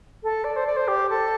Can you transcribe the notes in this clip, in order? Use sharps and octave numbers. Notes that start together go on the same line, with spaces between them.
A4
D5
C5
D5
C5
G4
A4